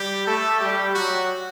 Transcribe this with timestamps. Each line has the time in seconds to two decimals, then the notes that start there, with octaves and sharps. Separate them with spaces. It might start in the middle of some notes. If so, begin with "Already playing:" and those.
Already playing: G3 G4
0.26 A3 A4
0.60 G3 G4
0.95 F#3 F#4